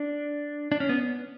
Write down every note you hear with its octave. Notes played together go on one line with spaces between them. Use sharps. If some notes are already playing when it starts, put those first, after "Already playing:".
Already playing: D4
D4
C#4
B3